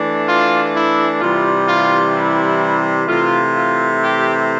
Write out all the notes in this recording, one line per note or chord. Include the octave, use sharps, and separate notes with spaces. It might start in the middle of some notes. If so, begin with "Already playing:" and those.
Already playing: E3 A3 D4
F4
E4
C3 E3 G3 F4
F4
E4
C3 E3 A3 F4
F4
G4